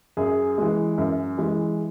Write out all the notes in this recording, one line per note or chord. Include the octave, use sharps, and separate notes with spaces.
F#2 G#4
E3 G#3
F#2
E3 G#3